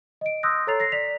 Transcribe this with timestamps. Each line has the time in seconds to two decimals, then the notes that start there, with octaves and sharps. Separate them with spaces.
0.21 D#5 D7
0.43 C6 D#6 E6 F#6 G6 A#6
0.67 A4 C#5 A#5 A6 C7 F7
0.80 A#6 C7
0.92 D5 B6 F7